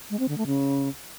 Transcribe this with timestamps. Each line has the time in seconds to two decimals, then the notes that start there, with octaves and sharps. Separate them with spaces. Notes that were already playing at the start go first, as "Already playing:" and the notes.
0.10 G#3
0.19 C4
0.28 D3
0.38 A3
0.47 C#3